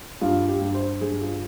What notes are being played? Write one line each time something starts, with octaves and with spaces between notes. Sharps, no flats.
G2 F4
G4
G2
C5
G2 G#4
F4